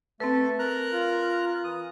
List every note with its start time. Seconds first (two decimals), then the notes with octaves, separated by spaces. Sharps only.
0.20 A3 C4 A4 B4
0.59 A#4 A#5 F#6
0.93 F4
1.64 E3 D#6